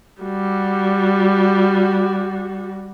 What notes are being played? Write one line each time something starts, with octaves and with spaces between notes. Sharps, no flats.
G3 F#4